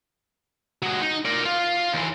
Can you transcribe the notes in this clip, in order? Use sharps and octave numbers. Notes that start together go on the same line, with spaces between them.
F#3 G#3
D#4
A#4 D5
F4
D#2 E3